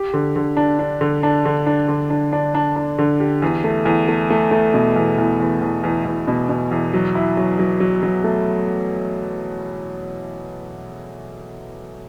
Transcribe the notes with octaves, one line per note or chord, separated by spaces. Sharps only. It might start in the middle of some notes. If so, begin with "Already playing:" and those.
Already playing: G4
D3
D3
D4
D4
D3
D4
D3
D4
D3
D4
D4
D4
D4
D3
G4
E2
A3
E2
A3
A3
A3
B2
E2
E2
E2
E2
E2
E2
B2
B2
E2
F#3
E4
F#3
F#3
F#3
F#3
A3